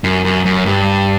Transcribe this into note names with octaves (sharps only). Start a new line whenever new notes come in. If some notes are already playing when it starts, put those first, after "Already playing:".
F#2
F#2
F#2
G2